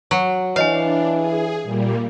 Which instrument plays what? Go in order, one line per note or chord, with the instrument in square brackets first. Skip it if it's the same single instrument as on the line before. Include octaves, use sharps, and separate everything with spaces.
[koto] F#3
[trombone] E3 [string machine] D4 [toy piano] C#5 D#5 G#5 [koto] F5
[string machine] G#4
A#2 G3 A#3